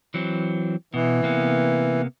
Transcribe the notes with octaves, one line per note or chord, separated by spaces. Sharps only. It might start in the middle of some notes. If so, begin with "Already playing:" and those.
E3 F#3 C4
B2 E3
C3 A#3 B3